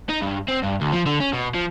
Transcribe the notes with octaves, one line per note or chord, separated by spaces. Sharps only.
D#4
G2
C4
G2
D2
F3
D3
C#4
B2
F3